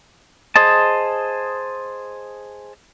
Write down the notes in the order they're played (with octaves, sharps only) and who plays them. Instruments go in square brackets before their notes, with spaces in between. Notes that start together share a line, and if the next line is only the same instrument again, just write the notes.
[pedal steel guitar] G#4 C5 D#5 A5